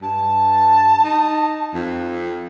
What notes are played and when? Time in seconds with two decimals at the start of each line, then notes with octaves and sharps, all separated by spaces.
0.02 G2 A5
1.04 D#4
1.74 F2